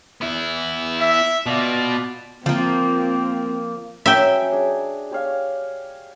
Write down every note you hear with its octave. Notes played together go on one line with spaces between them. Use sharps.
B3 E4
E5
B2 F4 D5
F3 A#3 C4
F#3 C#4 E5 G5
D4 G#4
G4 C#5 F5